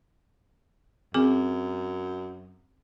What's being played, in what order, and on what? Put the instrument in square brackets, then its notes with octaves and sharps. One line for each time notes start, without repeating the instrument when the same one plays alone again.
[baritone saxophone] F#2 [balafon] C4 G#4 D6